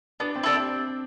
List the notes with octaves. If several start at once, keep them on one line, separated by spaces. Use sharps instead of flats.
B3 D4
C4
E4 A4 D5
C4